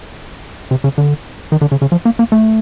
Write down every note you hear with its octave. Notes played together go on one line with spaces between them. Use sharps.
C3
C#3
D3
D#3
D3
C#3
C#3
F3
A#3
A#3
A3